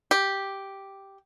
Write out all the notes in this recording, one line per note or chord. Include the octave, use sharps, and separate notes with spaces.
G4